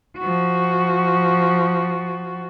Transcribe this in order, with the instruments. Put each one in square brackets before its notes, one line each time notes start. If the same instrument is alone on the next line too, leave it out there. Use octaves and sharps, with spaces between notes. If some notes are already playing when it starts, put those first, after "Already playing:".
[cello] F3 F#4